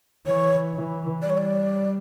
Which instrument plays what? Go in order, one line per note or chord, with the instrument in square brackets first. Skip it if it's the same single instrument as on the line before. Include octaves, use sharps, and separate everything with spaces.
[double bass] E3 [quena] C#5
[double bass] E3
[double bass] G3 [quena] D5
[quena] C#5
D5